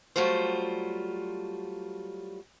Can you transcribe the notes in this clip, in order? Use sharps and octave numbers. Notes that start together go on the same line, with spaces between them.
F#3 G3 A3 F4 C5